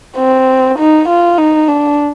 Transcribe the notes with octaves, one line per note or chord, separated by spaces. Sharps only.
C4
D#4
F4
D#4
D4